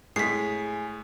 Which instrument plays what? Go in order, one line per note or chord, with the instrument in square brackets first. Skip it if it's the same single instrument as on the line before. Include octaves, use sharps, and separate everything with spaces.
[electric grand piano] A2 [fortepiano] G#3 [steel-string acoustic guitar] G#4 [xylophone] B6 C7